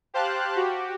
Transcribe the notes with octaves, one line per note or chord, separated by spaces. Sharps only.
G4 C5 F5 A5 F#6
F#4 G4